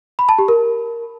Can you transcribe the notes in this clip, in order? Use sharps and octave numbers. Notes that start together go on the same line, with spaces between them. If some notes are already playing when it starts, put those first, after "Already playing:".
B5
A5
G4
A#4